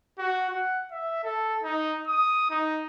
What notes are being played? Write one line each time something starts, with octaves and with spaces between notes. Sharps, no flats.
F#4
F#5
E5
A4
D#4
D#6
D#4